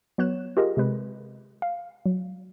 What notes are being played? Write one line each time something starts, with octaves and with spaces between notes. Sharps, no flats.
F#3 B3 C#5 F#6 E7
F4 G4 G#4 A#4 D#5
C3 G#3 B4
F5
F#3